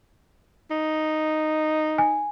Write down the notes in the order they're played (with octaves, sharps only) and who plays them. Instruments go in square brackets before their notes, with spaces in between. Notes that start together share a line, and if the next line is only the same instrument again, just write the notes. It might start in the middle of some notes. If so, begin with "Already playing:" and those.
[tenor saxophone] D#4
[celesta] G#5